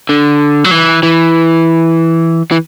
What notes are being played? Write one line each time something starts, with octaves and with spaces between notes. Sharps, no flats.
D3
F#3
E3
E3
E3